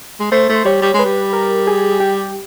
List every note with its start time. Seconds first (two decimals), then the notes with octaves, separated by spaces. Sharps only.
0.20 G#3
0.31 A3 C5
0.49 A3
0.55 C5
0.65 G3 C#5
0.82 G3
0.94 G#3
0.99 B4
1.05 G3
1.33 A#4
1.67 G#4
2.00 G4